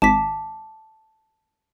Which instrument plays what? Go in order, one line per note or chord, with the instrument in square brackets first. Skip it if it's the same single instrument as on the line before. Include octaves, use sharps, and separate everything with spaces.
[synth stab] G#1 [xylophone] A5 D6 B6